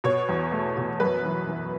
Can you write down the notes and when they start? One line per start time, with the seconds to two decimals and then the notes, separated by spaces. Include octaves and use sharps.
0.04 B2 C#5
0.29 E2
0.52 A3
0.77 B2
1.00 F#2 B4
1.25 E3
1.48 E3